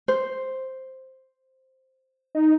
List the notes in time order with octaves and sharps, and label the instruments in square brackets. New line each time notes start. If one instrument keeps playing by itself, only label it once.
[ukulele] C5
[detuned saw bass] D#4